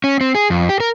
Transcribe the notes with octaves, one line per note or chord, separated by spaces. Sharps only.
C#4
C4
G#4
F2
G4
A#4